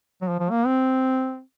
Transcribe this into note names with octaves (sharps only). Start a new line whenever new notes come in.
F#3
F3
F3
A#3
C4